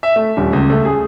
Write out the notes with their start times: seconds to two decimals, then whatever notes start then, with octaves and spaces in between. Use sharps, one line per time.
0.03 E5
0.16 A3
0.37 D#1
0.53 C#2
0.70 A3
0.85 G#4